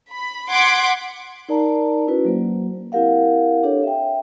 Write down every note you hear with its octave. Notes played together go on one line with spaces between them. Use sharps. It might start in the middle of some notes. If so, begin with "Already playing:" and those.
B5
F#5 C6 D6 G#6 B6 D7
D#4 A#4 D5 A5 A#5
C#4 E4 F#4 B4
F#3 A#3 C5
C4 E4 G4 A#4 F5 F#5
D4 G4 A4 C#5
E5 G5